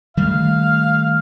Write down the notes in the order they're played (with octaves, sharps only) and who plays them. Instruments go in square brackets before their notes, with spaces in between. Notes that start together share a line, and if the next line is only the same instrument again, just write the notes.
[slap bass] D#3 G3 A3 [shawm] F5